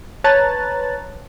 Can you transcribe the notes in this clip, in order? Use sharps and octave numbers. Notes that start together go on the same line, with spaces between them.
B4 C#5 A5 A#5 F#6 A6